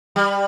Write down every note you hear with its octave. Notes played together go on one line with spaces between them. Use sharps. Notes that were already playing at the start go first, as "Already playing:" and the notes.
G3